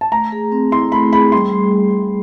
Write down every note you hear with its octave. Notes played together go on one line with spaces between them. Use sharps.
A5
A3 A#5
G#4
C4
E4 C6
A3 B5
G#4 B5
G3 C6
G3